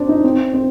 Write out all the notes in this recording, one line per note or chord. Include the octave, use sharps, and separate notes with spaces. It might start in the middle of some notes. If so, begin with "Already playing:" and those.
Already playing: C4 D4
D#4
C4
C4